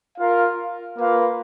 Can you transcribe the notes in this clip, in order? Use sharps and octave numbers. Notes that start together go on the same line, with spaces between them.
F4 A#4 F5
A#3 F4 B4 F5